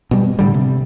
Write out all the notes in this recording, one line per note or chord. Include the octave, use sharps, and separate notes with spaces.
B2 G3
A2 D3 G3
C3